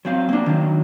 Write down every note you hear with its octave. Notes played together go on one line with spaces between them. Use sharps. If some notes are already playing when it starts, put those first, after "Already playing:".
F#3 C4 F5
A#3 D4
D#3 F#3